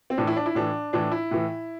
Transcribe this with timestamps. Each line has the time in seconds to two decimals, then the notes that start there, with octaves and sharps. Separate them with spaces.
0.10 C4
0.17 A2 E3 D4
0.27 E4
0.36 D4
0.46 E4
0.55 A2 E3 D4
0.93 A2 E3 D4
1.11 E4
1.31 A2 E3